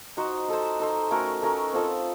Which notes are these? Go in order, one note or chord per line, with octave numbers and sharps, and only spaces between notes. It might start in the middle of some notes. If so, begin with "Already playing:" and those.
D#4 F#4 C5
D#4 A4 C5
D#4 A4 C5
A3 C#4 F#4 A#4
A3 C#4 F#4 A#4
C4 F4 A4 D#5